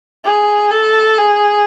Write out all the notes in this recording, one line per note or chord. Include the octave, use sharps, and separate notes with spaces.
G#4
A4
G#4